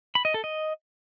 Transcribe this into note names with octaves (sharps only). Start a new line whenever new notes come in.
B5
D#5
A4
D#5